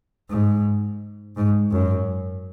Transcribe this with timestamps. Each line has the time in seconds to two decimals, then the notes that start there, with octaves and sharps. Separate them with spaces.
0.30 G#2
1.36 G#2
1.71 F#2